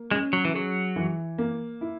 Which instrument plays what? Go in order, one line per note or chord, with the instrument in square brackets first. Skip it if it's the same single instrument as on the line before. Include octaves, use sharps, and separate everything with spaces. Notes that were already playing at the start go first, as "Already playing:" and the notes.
Already playing: [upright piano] A#3
[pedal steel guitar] G#3 [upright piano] C#4
[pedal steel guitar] F#3
E3
[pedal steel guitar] F#3 [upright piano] G#4
[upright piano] E3
A#3
E4